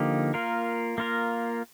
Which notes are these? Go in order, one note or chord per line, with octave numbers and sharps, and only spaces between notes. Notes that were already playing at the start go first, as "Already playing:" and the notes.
Already playing: D3 F3 A#3 D#4 G4
A#3 F4 A#4
A#3 F4 A#4